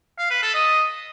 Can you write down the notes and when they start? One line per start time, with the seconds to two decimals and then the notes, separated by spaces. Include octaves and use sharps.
0.19 F5
0.30 B4
0.42 A4
0.54 D#5